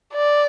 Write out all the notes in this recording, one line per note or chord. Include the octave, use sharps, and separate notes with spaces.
D5